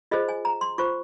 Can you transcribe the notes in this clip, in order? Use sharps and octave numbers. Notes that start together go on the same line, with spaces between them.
F4 G#4 C5 D#5
G#5
A#5
C6
F4 C5 C#6